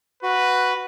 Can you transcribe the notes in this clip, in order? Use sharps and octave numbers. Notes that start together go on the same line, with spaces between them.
F#4 B4